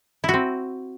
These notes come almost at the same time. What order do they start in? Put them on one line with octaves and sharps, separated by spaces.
E4 F#4 C4